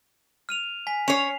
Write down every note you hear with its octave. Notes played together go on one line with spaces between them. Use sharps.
F6 D#7 F7
G#5 B6
C#4 C#5 C7 F7